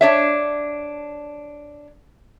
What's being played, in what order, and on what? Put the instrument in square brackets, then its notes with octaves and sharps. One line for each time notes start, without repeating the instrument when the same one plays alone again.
[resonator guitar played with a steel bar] D4 C#5 E5